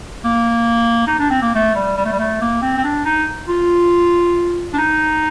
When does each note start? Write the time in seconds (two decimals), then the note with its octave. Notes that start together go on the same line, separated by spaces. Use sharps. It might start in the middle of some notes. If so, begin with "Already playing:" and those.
0.24 A#3
1.07 D#4
1.19 D4
1.31 C4
1.42 A#3
1.55 A3
1.75 G3
1.97 G3
2.05 A3
2.12 G3
2.19 A3
2.41 A#3
2.62 C4
2.78 C4
2.84 D4
3.05 D#4
3.48 F4
4.73 D4
4.78 D#4